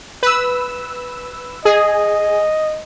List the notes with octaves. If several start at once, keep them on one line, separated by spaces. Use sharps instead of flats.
B4 E6
G#4 D#5